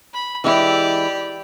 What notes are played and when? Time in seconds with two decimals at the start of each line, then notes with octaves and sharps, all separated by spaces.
0.13 B5
0.44 E3 G#3 E4 G4 D5